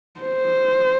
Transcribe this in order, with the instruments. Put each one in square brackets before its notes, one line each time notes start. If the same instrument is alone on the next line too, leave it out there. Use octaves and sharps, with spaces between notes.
[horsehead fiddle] C5